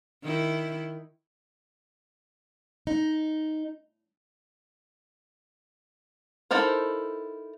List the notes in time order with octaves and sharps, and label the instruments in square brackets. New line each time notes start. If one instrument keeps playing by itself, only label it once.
[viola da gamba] D#3 E4
[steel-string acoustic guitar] D#4
[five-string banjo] D#4 E4 A4 A#4 C5